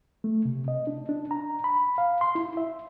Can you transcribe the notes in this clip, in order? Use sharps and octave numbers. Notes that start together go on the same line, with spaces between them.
A3
C3
D#5
D4
D4
A#5
B5
F5
C6
E4
E5